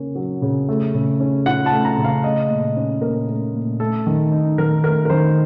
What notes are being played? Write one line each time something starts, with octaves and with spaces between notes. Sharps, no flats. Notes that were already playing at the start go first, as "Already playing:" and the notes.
Already playing: C#3 A#3 C#4
F#3
C#3
A3
C#3
C#4
F4 F#5
A5
A3
A#5
C#3
F5
A3 D#5
A#2
C#4
A#2 A#4
A3
A#2
A3 A4
D#3
D#4
D#3 A#4
A3 A#4
A#4
D#3 C5